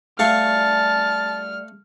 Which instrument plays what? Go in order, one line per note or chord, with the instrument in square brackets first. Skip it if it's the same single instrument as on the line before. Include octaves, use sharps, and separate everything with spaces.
[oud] G3 F#4 [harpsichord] A3 F5 C#6 [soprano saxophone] A5 [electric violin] F6